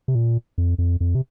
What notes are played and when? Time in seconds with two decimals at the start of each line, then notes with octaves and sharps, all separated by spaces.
0.08 C3
0.15 A#2
0.58 F2
0.78 F2
1.00 F2
1.15 C3